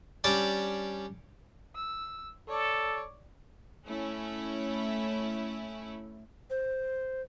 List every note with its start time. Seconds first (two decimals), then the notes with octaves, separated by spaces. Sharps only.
0.24 G3 C#4 D4 D5 G5
1.76 E6
2.48 A4 C#5 D5
3.86 A3 C#4 E4
6.50 C5